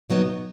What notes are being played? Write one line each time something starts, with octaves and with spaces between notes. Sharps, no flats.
B2 F#3 B3 D#4